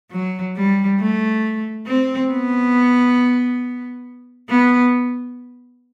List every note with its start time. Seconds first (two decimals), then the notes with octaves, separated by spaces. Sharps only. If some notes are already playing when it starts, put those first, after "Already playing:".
0.11 F#3
0.56 G3
1.00 A3
1.87 C4
2.31 B3
4.49 B3